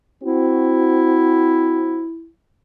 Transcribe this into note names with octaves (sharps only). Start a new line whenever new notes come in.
C4 E4 F#4